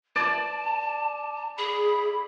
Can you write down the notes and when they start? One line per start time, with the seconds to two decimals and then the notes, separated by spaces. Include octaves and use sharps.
0.16 D5 A5
1.58 G#4 B5